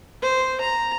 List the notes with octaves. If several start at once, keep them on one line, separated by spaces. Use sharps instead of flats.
C5
A#5